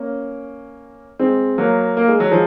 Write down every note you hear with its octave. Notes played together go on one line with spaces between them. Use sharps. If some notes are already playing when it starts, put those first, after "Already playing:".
Already playing: A#3 C#4
G#3 C4
F#3 A#3
A#3
G#3
F#3
F3 G#3